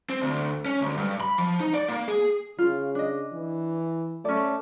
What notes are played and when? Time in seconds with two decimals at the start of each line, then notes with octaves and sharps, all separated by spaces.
0.10 C4
0.22 D2
0.66 C#4
0.82 D2
0.97 G2
1.20 B5
1.38 F3
1.60 D#4
1.74 D5
1.88 A#3
2.08 G#4
2.58 C#3 F4
2.95 D4 D#5
3.33 E3
4.25 A3 C#4 D5